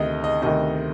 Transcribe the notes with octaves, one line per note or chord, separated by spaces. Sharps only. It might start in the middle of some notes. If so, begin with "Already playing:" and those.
Already playing: D2 C3 D#3 D#5
D#5
D2 C3 D#3 D#5